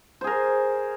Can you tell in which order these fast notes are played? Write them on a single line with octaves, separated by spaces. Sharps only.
C5 G#4 A#4